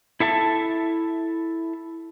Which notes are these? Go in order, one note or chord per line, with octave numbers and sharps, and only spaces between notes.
E4 A4 E5 A5